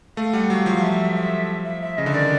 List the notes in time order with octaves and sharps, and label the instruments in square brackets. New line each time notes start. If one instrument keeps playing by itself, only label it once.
[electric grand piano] A3 [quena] F5
[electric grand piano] G3 [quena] F#5
[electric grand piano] F#3 [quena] F5
[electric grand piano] F3 [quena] F5
[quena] E5
E5
E5
E5
[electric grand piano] C#3 [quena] D#5
[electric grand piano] D3
[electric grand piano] D#3 [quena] D5